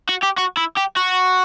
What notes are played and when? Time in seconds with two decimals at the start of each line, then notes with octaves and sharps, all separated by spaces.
0.09 F#4
0.23 G4
0.38 F#4
0.57 E4
0.77 G4
0.97 F#4